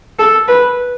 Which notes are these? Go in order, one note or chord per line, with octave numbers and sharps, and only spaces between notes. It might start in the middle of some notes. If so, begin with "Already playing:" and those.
A4
B4